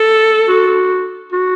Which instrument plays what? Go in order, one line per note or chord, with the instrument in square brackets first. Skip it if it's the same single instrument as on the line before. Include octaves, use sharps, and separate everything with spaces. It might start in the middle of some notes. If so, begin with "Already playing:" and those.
Already playing: [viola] A4
[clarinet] F#4
F#4